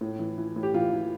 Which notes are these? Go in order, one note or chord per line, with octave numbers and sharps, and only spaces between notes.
A2
E3
E3
A2
G4
E3 F4
E3